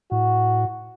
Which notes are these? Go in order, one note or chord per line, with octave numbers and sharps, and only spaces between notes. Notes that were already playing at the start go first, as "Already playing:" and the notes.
A2 F#4